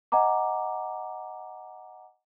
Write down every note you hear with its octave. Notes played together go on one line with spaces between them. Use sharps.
D#5 F#5 G#5 A#5 D6